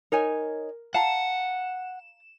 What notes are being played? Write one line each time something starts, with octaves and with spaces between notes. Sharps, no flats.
D#4 A#4 C#5 G#5
F5 F#5 A5 A#5 E7